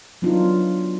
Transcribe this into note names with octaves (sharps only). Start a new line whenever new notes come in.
F#3 B3 D4 D#4 F4